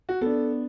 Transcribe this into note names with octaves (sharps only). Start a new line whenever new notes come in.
F#4
B3 D4 A4